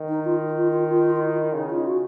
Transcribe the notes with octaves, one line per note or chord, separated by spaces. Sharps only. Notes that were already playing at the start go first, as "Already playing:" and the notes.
Already playing: D#3
D#4
F4
F4
F4
F4
F4
E4
C#3 D#4
F4
F#4